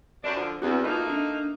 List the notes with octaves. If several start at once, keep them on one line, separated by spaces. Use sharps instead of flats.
F#2 D4 D5
D3 F3
E2 C4 F#4
A3 A#3 D#4 F4 F#4 B4
D4 E5